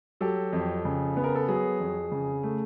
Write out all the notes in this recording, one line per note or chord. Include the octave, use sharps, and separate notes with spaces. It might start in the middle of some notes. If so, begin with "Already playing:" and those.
F#3 G4 A4
F2
C#3
B3
A#4
A4
F#3 G#4
F2
C#3
A3